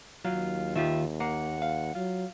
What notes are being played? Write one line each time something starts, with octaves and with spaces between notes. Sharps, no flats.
D#2 F#3 F4
D#3 F4 G4 E5
A#3 F#5
F5
F#3 F4